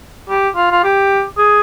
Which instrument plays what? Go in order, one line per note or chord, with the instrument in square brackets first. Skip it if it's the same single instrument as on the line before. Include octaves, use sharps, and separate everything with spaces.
[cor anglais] G4
F4
F4
G4
G#4